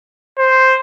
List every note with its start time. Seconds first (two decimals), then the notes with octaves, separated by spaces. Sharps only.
0.39 C5